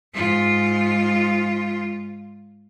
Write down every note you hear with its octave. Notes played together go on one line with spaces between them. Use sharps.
G#2 F4